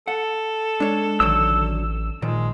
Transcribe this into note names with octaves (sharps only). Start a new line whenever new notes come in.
A4 F#5
G#3 D4 C#5
A1 D3 D#3 F#3 E6
A#2 D#3 F3 G#3